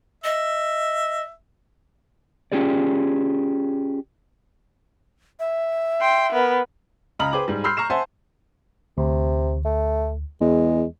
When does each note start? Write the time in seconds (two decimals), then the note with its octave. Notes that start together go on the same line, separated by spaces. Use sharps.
0.24 D#5 E5
2.52 C#4 F4 G4 G#4 D5
5.40 E5
6.01 G5 C6
6.32 B3 A#4
7.19 C#2 D#5 A#5 B5 F6 F#7
7.33 G#4 B4 C5 G5 D6
7.48 G#2 G3
7.64 B5 C6 E6 F6 G6 C7
7.77 A#5 C#6 F6 C7 E7
7.90 C5 E5 F#5 G#5 A5 C6
8.98 D2 C3
9.65 A3
10.41 E2 G#3